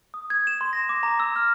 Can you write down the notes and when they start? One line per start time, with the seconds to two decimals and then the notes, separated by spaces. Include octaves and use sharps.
0.14 D#6
0.30 G#6
0.47 E7
0.61 C6
0.73 A#6
0.89 D6
1.03 A#5
1.20 E6
1.36 F6